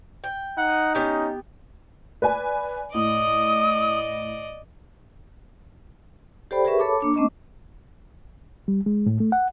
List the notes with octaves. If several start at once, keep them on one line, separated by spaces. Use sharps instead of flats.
G5
D#4 F#5
B3 C#4 G4
B4 D5 G#5
A2 D5 D#5 D#6
G4 A4 C5 D5 G5 B5
G4 G#4 A#4 B4 E5 C#6
A4 C#5 A5 B5 D6
A#3 D4 D6
A3 C4 C#4 D#5 C#6 D6
G3
G#3
A2
A3
F#5